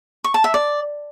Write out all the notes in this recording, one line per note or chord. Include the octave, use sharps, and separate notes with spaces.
C#6
A5
E5
D5